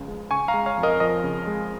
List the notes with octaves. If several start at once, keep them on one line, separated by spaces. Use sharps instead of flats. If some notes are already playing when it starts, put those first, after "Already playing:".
Already playing: C#2 C#3 F3
G#3
C#3 G#5 C#6
F5 A#5
G#3
C#5 F5
F2
A#4 D#5
F3 A#4 D#5
C#3
G#3